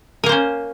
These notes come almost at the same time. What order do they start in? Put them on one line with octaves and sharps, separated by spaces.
A#4 A#3 C5 C#4